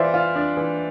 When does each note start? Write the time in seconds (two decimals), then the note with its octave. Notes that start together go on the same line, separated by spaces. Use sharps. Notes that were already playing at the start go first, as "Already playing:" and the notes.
Already playing: E3 F4 C5 D5 E5
0.14 F4
0.36 D4
0.57 E3